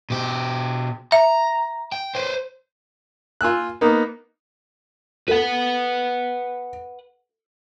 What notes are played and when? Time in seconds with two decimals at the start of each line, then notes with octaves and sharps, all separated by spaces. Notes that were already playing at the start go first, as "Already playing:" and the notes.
0.10 B2 G4
1.12 E5 A#5
1.92 G5
2.15 B4 C5
3.41 F4 G#5 E6 F#6
3.81 A#3 B3 D#4
5.28 A4 B4 F#5